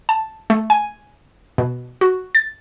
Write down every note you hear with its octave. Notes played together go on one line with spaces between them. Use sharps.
A5
A3
G#5
B2
F#4
A6